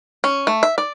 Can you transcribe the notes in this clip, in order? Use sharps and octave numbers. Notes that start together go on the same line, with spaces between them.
C#4
A3
E5
D5